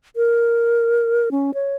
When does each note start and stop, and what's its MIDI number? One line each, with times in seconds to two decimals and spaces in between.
0.16 1.29 70
1.31 1.51 61
1.54 1.77 73